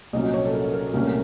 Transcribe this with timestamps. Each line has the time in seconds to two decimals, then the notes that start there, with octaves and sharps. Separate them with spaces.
0.13 C2 A#2 F#3 A#3 C#4 D#5
0.34 C#5
0.45 A4
0.53 A#4
0.74 A#4
0.93 C2 A#2 A3 C#4 A#4